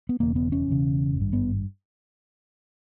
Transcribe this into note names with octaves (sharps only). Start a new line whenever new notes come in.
B3
E1 E2 C#3 A#3
B3
C#4
E1 E2 C#3
G#1 G2
B3